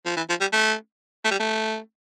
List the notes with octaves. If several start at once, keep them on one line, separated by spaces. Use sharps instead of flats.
F3
E3
F3
G3
A3
A3
G3
A3